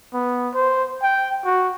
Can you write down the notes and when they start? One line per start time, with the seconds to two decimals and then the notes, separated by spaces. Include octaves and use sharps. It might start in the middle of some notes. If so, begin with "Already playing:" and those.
0.14 B3
0.54 C5
1.02 G5
1.45 F#4